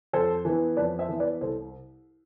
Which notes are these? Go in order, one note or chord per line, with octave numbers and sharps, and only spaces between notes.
F2 A4 C5
E3 B3
F2 B4 D5
C5 E5
E3 B3
B4 D5
C2 A4 C5